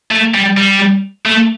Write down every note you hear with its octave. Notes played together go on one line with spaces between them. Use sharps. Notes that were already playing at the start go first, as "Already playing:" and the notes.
A3
G3
G3
A3